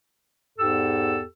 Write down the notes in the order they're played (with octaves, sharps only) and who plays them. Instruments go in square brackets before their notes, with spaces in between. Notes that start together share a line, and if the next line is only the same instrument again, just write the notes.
[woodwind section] E2 G#2 G4 A4 E6